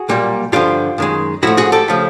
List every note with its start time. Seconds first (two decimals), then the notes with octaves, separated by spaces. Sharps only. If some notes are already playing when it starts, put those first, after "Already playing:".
Already playing: F#4 G#4
0.09 B1 A#2 G3 A#3
0.52 G2 D3 F3 F4 G4
0.98 F#2 D#3 G#3
1.42 A2 F3 A3 E4 F#4
1.57 F#4 G#4
1.72 G4 A4
1.88 C#3 F3 A3